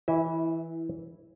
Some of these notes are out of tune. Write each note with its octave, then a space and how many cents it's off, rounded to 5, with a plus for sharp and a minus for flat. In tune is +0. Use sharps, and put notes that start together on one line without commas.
E3 -10 E4 +0 E5 -40